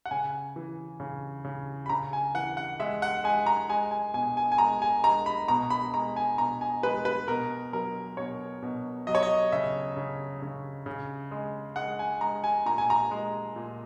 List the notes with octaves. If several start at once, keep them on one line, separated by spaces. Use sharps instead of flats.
F#5
C#3 G#5
E3
C#3
C#3
B5
C#3 A#5
G#5
E3 F#5
F#5
G#3 E5
F#5
G#3 G#5
A#5
G#3 G#5
G#5
B2 G#5
G#5
G#5
G#3 A#5
G#5
G#3 A#5
B5
B2 A#5
B5
G#3 A#5
G#5
B2 A#5
G#5
G#3 B4
B4
B2 A#4
F#3 A#4
B2 C#5
B2
F#3 D#5
C#5
D#5
C#3 E5
C#3
C#3
C#3
G#3
G#3 F#5
G#5
G#3 A#5
G#5
A#2 A#5
G#5
A#5
G#3
A#2